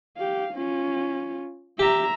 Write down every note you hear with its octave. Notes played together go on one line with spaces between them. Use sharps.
G4 F5
C#4 F4
G4 E5 A#5